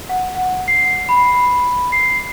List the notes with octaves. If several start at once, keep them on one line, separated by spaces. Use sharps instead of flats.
F#5
F#5
C7
B5
C7